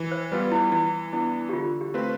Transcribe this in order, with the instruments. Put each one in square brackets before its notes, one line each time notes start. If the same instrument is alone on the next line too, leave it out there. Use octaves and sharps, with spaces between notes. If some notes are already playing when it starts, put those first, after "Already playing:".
Already playing: [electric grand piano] E3
[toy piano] C5
[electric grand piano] G3 B3 F4 [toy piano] B4
[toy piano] E4
[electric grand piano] E3 [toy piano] E4
[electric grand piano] B3 D4 [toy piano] E4
[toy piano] G4
[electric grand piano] D3 [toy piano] F4
[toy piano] G4
[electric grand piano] A3 C4 F4 B4